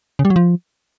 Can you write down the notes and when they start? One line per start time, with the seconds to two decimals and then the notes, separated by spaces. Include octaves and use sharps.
0.19 C#3
0.25 G3
0.30 F#3
0.36 F3